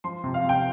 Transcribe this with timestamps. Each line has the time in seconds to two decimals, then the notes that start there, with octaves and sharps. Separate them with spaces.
0.04 F3 C6
0.24 C3
0.34 F5
0.44 C3 G5